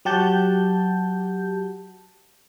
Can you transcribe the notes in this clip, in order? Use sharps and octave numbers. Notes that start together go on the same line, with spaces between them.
F#3 F#4 G4 F#5 A5 G6